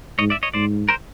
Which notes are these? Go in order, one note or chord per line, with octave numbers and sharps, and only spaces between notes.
G#2 C#5 D#5
D5 E5
C#5 D#5
G#2 C5 D5
A#4 C5